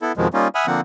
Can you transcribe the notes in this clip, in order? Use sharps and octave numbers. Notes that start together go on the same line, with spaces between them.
B3 E4 A4
F2 B2 D#3 F3 G#3
G3 A#3 C#4 D#4 F4
E5 F#5 G#5 B5 D#6 F6
D3 F3 A#3 C4 F#5